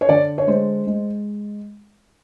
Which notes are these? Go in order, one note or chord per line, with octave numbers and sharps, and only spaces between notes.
C#5
D3 D5
C#5
G#3 C5
G#3